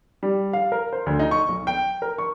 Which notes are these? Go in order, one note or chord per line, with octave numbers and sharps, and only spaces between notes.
G3
F5
A#4
C5
D2
D#4
C#6
B1
G5
A#4
C#6